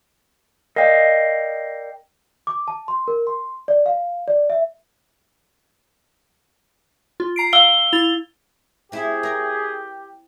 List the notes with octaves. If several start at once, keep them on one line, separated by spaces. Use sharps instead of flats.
A#4 D5 D#5 F5 G5
D6
A5
C6
A#4
C6
D5
F5
D5
E5
F4
A#5 C7 D7
F5 E6 G7
E4 A6 F7
C4 E4 G4 G#4
A#4